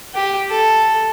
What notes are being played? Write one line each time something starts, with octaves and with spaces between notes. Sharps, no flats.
G4
A4